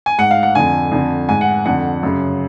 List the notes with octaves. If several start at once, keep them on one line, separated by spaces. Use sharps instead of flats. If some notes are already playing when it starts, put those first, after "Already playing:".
G#5
G#2 F#5
F5
F#5
F2 D3 G#5
F2 D3
G#2 G#5
F#5
F2 D3 F#5
F#2 C#3